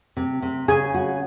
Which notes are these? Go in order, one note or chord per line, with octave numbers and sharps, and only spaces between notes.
C3
C3
C#3 G#4 G#5
F#4